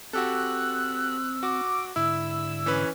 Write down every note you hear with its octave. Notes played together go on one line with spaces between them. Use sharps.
C4 F#4 G4 A4 E6 F#6
F#4 D6
G#2 D3 E4 E6
E3 C#4 B4